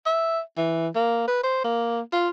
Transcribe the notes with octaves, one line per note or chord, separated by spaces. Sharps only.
E5
E3
A#3
B4
C5
A#3
F4